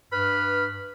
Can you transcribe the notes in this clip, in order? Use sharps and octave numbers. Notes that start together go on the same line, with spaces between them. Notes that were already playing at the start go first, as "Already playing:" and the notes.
G2 B4 B5 F6